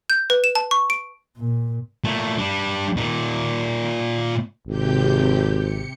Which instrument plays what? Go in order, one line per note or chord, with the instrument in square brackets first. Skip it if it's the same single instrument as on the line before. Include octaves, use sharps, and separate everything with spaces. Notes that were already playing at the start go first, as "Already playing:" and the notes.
[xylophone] G6
B4
E7
A5
C#6
D7
[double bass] A#2
[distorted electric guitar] A#2 A3
G3 D4
A#2 D#4
[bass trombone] G#1 [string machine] C3 G4 G6
[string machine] C#7